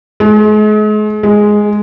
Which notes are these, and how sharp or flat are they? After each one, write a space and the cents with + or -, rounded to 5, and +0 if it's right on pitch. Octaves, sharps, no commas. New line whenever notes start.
G#3 +40
G#3 +0